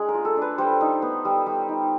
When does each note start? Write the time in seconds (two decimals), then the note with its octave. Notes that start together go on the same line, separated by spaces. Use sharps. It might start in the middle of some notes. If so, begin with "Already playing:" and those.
Already playing: G#3 D4 G#4
0.09 A#4
0.14 F4
0.25 A4
0.37 D4 B4
0.58 G3 C5
0.81 D#4
1.02 B3
1.25 G3
1.46 G3
1.69 D#4